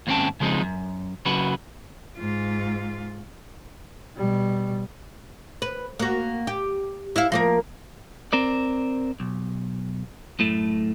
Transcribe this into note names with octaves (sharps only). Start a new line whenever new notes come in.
D#2 G#2 C4 C#4 G5 A5
C#3 F3 G#3 C4 D#4
F#2
C#3 F#3 F#4 B4
G#2 F4
B2 G3
B4
A#3 F#4
G4
E4 F5
F3 A#3 A#4
C4 A#4 D5
B1
F#2 A2 A3